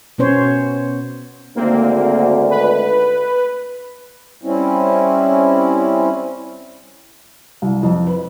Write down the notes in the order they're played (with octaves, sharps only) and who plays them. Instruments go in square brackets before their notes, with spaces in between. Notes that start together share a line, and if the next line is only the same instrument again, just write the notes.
[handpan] B2 B3 C#4 C5 C#5
[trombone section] G#1 D2 [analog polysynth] A#3 C4
[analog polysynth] B4
[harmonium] G3 C4 C#4 E4
[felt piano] C2
F2
B4